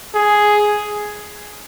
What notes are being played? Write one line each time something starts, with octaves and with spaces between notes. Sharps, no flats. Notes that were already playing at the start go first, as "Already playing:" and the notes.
G#4